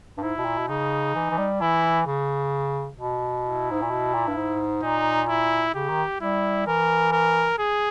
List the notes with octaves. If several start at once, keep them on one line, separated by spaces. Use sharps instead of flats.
G2
G#2 E4
B2
A#2
B2
C#3 D#4
E3
E3
G3
E3 E4
C#3
B2
E4
G#2
A#2
B2
A#2
G2
G#2
A#2 D#4
E4
C#3 G4
D#3
G3 E4
E3 A#4
A#4
G#4